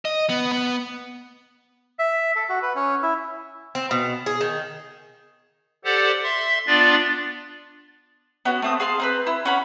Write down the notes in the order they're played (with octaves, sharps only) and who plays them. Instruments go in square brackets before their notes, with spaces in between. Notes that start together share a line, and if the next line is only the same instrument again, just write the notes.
[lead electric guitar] D#5
B3
B3
[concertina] E5
A4
F#4
B4
C#4
E4
[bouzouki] C4
B2
G#4
D#3
[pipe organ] G4 A4 C5 D5 F#5
E5 C6
B3 D4 F4 D5 A6
[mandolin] B3 C#4 F#4
A3 C4 D#6
G#4 F5 A5 C6
C4 A#4 B4
E4 E6
C#4 F#5 B5